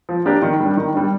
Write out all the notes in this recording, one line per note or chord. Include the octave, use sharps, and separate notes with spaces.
F3
A#3 D4 G4 A#4
D#3
G3 D4
D#3
G3 D4